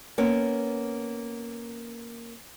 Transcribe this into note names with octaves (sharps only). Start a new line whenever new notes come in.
A#3 B3 C#4